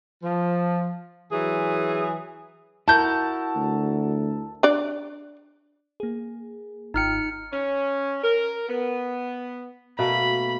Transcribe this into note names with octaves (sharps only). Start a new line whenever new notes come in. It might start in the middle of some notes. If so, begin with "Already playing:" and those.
F3
E3 F#3 G#4
E4 F#4 A#4 A5 G6
D2
D4 D5
A#3 G#4
G#1 D#4 F4 G5 F6 C#7
C#4
A#4
B3
B2 A3 A#3 B5